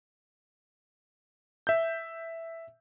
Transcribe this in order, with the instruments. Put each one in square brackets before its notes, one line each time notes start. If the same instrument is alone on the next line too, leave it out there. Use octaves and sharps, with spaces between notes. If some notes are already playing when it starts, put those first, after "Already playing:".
[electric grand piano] E5 G6